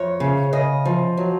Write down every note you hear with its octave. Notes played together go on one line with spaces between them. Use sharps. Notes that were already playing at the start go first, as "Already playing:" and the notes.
Already playing: F2 C#5
C#3
C#3 D#5
F3
F#3